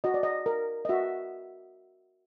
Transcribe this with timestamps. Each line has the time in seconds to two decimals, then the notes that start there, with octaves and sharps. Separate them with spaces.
0.04 F#4 D#5
0.14 D5
0.23 D#5
0.46 A#4
0.85 D#5
0.89 F#4 E5